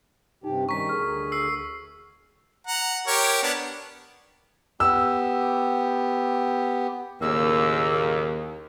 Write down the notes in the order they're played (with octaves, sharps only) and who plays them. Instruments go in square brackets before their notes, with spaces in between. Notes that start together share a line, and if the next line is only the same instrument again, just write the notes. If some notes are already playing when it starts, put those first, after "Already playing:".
[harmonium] G2 C3 G4 [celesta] D#4
[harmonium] D#3 G3 C#4 [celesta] A#5 [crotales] C#6 B6
[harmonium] D2 G#4 [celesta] A#4 F6
[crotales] E6 C7
[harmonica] F#5 A#5
G4 A#4 C#5
B3 D4
[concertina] B3 G4 [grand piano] E6
[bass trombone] D#2 [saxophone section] A2 C#3 A#3 [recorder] E6